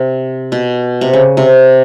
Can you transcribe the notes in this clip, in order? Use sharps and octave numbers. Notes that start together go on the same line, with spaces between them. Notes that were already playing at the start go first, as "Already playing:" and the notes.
Already playing: C3
B2
C3
C#3
C3